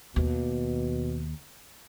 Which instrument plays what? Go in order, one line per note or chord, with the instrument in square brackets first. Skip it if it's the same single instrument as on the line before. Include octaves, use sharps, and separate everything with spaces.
[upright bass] D#2 [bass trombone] B2